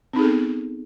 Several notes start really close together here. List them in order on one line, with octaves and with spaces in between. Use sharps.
C4 D#4 G#4 A4 B3